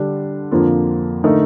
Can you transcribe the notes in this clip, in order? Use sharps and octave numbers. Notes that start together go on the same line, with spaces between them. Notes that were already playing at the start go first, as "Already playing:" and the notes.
Already playing: D3 G3 D4
F2 D3 F3 A#3 F4
D3 A3 D#4 A#4